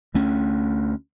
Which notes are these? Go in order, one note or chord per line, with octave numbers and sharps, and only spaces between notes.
D2 A3 C#4